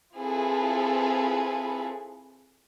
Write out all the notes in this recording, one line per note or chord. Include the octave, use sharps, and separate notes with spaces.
C4 E4 F4 G#4 A4 B4